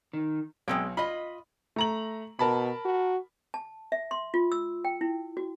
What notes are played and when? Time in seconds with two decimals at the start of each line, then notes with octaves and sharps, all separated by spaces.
0.13 D#3
0.68 B1 G#3 C4 G5
0.97 F4 D#5 B5
1.76 A3 A#5 F#7
2.39 B2 A#4 A5 B5
2.85 F#4
3.54 A5
3.92 E5
4.11 C6
4.34 F4
4.52 E6
4.85 G5
5.01 E4
5.37 F#4